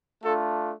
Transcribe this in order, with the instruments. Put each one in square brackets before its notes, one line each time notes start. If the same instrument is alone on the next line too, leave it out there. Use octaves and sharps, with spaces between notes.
[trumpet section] A3 D4 F4 A4